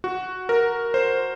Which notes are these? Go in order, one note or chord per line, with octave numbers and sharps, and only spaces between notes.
F#4
A#4
C5